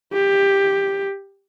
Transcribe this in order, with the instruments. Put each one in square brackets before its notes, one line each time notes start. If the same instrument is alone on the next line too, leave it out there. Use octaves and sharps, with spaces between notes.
[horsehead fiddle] G4